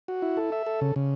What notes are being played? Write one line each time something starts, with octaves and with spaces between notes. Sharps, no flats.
F#4
E4
A4
E5
A4
C#3
C#3